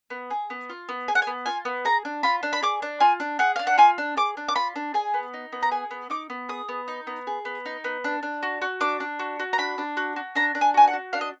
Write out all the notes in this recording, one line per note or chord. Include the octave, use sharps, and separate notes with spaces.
B3
G#4
B3
F4
B3
G#4 G#5
F#5
G#5
B3
F4 G#5
B3
G#4 A#5
D4
F4 B5
D4
B5
G#4 D6
D4
F4 G#5
D4
G#4 F#5
D4 F5
F#5
F4 G#5
D4
G#4 D6
D4
D6
F4 B5
D4
G#4 G#5
B3
D#4
B3
A#5
G#4 G#5
B3
D#4 D6
B3
G#4 D#6
B3
D#4
B3
G#4
B3
D#4
B3
D4
D4
F#4
F#4
D4 D6
D4
F#4
F#4
A#5
D4 B5
D4
F#4
F#4
D4 A#5
D4
G#5
F#4 G#5
F#5
F#4
D4 F5
D#5